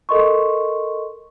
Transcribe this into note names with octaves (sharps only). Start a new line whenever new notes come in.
A4 A#4 D#5 C6 C#6